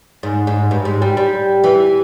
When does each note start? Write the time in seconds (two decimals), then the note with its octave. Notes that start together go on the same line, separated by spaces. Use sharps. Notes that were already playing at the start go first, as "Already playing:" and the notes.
0.23 G#2
0.47 G#2
0.71 G2
0.85 G#2
1.02 G3
1.17 G3
1.64 E3